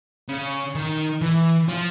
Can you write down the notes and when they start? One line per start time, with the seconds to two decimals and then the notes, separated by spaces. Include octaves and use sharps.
0.29 C#3
0.75 D#3
1.21 E3
1.69 F3